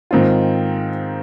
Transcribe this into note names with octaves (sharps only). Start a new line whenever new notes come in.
G#2 D#3 C4 F4